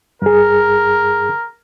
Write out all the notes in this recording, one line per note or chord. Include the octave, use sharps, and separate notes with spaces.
G2 G#4 A#4